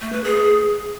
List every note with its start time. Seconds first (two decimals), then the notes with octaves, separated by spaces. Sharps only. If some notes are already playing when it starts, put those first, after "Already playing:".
0.01 A3
0.12 B4
0.24 G#4